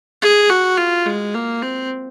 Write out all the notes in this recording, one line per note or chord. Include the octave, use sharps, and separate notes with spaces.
G#4
F#4
F4
G#3
A#3
C4